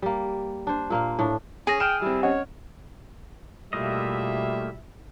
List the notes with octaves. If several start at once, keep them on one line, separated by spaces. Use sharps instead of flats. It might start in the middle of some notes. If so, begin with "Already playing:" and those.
G3 A#3
D4 C5
A#2 A#3 C5 F5
A2 D4
C#4 G#4 G#5 A#6
G5 F6 D7 E7
G3 C4 E4
C#4 C#5 D#5 F#5
B2 G3 A3 A#3 E4 F4 D#5 E5